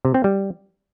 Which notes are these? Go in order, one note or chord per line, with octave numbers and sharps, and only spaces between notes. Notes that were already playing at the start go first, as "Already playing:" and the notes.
C3
C4
G3